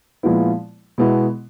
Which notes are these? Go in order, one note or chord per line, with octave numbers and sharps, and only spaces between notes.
A#2 F3 G#3 B3 E4
B2 G#3 B3 E4